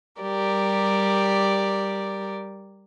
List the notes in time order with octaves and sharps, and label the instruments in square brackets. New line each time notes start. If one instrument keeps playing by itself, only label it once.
[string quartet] G3 G4 A#4 D5